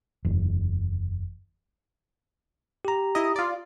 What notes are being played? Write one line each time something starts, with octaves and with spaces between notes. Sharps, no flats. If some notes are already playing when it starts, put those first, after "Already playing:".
F#1 E2
G4 A#5
E4 D#5
F4 D5